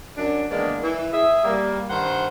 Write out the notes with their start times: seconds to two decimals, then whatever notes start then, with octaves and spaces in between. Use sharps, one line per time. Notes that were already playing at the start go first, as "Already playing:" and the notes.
0.17 F#2 D4
0.51 D#3 E3 G#3 A#3 B3 D4
0.83 E3
1.13 G#4 E5
1.44 G3 A#3
1.89 G2 D#3 C5 F#5 C6